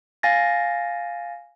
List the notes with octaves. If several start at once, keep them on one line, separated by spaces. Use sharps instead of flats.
F5 G#5 A6 A#6